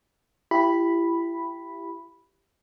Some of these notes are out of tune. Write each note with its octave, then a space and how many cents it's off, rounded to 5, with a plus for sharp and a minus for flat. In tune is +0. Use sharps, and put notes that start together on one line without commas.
E4 +30 G4 +0 B5 +0